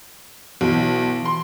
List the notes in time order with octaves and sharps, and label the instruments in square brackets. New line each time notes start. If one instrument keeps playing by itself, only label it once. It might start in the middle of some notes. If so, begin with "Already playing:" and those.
[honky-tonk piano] B1 [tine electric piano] E3
[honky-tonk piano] C6